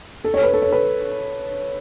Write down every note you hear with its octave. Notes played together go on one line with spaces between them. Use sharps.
A4
C#5
B4
A4
C#5
B4